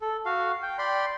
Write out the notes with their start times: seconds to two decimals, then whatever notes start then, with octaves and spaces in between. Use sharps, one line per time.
0.01 A4
0.26 F#4 F5
0.62 G5
0.78 D5 G5 B5 C6